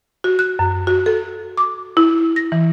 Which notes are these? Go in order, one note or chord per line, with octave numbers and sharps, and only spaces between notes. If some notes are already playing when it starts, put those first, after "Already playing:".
F#4
F#6
F#2
F#4
A4
D6
E4
A#6
E3